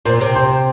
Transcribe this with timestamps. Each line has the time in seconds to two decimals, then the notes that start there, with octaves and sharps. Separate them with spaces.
0.05 A#2 C5
0.21 C3
0.35 C5